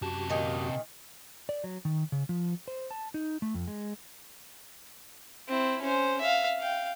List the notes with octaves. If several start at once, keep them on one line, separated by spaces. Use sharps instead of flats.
F#2 C3 F#4 G4 A5
A#2 D#3
D5
F#3
D#3
C#3
F3
C5
A5
D#4
A3
F2
G#3
C4 E4
C#4 C5
E5 F5
F5 G5